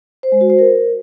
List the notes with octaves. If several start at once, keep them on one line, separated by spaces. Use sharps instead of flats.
C5
G#3
F#4
C5
A#4